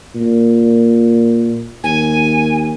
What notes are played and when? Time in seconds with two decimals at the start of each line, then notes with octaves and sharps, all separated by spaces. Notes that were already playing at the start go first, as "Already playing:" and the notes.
0.15 A#2
1.83 D#2 G#5